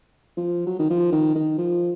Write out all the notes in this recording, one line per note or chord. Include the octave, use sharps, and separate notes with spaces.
F3
F#3
D#3
F3
D#3
D#3
F3